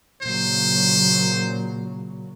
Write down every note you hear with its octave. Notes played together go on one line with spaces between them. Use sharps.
A#2 C#3 F#3 C5